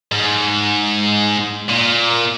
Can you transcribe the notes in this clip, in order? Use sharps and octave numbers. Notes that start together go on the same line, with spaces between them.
G#2
A#2